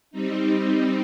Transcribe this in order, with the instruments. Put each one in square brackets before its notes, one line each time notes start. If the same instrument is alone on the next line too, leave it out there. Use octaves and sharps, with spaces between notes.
[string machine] G3 C4 D#4